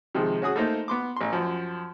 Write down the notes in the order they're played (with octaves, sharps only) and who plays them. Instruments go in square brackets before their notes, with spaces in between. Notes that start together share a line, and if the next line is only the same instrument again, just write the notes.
[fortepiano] C3 D#3 F3 G#3
C#4 F#4 G#4 D#6
A3 A#3 D#4 C5
B3 C6 D6
A1 C6
F#2 F3